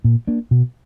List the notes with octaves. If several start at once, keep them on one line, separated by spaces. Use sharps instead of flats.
A#2
A#3 D4
B2